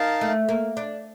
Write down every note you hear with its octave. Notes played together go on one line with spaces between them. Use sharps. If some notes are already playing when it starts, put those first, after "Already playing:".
Already playing: D#4 A#4 F5 A5
A3
A#3
D4